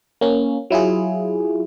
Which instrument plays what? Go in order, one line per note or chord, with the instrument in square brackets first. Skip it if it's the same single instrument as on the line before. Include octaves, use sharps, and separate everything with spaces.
[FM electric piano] A#3 C#4
F#3 E4 F4 G#4